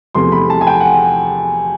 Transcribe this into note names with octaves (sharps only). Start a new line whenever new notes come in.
E2 C3 F3 A3 C6
B5
A5
G#5
G5
F#5